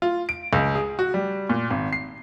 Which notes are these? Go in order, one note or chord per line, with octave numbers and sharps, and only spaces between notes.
F4
D7
C#2
G#4
F#4
G3
A#2
G#1
C7